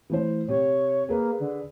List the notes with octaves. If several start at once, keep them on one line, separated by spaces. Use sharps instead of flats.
E3 A3 C5
C3 G4 C#5
A#3 G#4 B4
D3